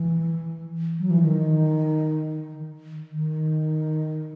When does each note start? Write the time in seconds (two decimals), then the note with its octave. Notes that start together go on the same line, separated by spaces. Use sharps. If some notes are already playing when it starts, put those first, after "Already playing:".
Already playing: E3
0.99 F#3
1.10 E3
1.20 D#3
3.11 D#3